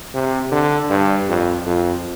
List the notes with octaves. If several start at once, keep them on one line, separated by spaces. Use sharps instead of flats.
C3
D3
G2
F2
F2